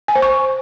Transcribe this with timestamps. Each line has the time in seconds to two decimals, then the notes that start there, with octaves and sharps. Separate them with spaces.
0.08 G#5
0.15 C5
0.22 C#6